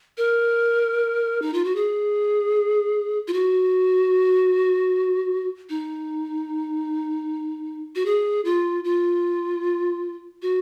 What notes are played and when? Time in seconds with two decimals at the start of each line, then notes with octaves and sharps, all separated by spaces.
0.18 A#4
1.42 D#4
1.54 F4
1.65 F#4
1.76 G#4
3.28 F4
3.33 F#4
5.70 D#4
7.95 F#4
8.06 G#4
8.45 F4
8.84 F4
10.42 F#4